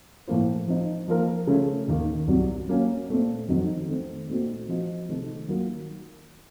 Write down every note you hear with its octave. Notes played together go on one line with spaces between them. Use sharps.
A2 F3 A#3 F4 C5
F3 C4 D#4
F3 A#3 F4 A#4
C#3 A3 C#4 F4
D#2 D#3 A#3
C2 C3 F#3
F#3 A#3 C#4
A#2 A3 C4
F2 D#3 F#3 C4 D#4
D#3 A3 C4
A#2 A3 C4 D#4 F#4
F3 C4 F#4 C5 D#5
C3 D#3 A3 D#4 A4
D#3 F#3 A#3 F4 A#4